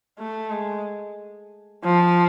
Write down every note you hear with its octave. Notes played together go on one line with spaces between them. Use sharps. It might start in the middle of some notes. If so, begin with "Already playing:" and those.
A3
G#3
F3